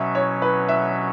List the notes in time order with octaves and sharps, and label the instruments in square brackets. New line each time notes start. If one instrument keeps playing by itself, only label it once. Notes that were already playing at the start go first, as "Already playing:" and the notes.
Already playing: [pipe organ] B2 F#3 C#4 [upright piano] E5
[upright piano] C#5
B4
E5